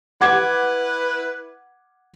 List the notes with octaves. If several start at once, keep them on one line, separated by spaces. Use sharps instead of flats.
E4 B4 F#5 D6 G#6